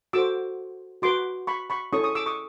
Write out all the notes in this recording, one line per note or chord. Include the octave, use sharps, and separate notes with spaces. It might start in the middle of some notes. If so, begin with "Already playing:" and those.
F#4 A4 C5 D6 E6
F#4 B4 C6 D6
B5 C#6
B5 C#6
C#4 E4 A4 C#5 C#6 D#6
C#6 D#6
D6 E6
C#6 D#6